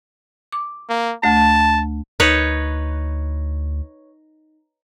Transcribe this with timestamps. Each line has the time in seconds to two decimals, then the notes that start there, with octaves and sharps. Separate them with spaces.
0.52 D6
0.90 A#3
1.23 D2 A3 A5
2.20 D2 D#4 B4 C#5